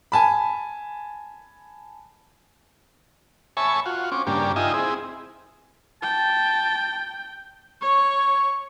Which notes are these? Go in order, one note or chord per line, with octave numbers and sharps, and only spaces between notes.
G#5 A5 B5
C#5 E5 G#5 A5 B5 C#6
F4 F#4
C4 C#4 D6
G2 C#3 A#3 D4 G4
D#4 F4 D#5 E5 G5 G#5
C4 E4 G#4
G5 A5
C#5 C#6